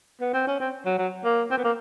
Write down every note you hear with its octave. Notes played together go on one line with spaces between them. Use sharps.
B3
C4
C#4
C4
F#3
F#3
A#3
C4
B3
A#3